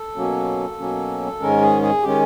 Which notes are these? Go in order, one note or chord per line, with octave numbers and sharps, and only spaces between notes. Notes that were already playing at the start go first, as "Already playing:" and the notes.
Already playing: A4
B2 F#3 A#3 C#4
B2 F#3 A#3 C#4
G#2 D#3 G#3 C#4 A#4
G#4
G#4
D#3 G#3 C#4 G4